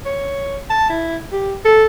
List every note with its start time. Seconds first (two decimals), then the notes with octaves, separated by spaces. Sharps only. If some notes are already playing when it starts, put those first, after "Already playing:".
0.05 C#5
0.70 A5
0.89 E4
1.32 G4
1.65 A4